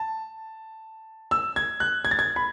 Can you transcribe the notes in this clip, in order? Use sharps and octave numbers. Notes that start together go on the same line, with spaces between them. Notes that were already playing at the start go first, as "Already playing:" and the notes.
Already playing: A5
E6
G#6
F#6
G#6
A6
G#6
B5